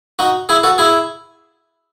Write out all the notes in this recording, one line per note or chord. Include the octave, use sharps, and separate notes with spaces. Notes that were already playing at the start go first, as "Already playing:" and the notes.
D#4 F#4
E4 G#4
F#4 A4
E4 G#4